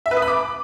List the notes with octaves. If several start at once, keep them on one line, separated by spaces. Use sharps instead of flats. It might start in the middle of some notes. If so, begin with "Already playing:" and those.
E5
B4
D#6
B5
D6